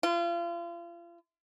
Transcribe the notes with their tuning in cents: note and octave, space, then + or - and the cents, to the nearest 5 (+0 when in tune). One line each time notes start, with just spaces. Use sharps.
F4 -35